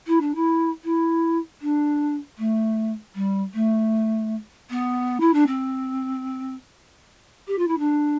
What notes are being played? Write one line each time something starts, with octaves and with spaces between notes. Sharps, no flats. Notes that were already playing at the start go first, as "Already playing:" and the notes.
E4
D4
E4
E4
D4
A3
G3
A3
B3
E4
D4
C4
G4
F4
E4
D4